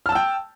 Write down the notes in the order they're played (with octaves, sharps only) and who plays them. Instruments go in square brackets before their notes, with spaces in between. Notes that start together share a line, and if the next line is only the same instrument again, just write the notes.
[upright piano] F6
A5
E6
G5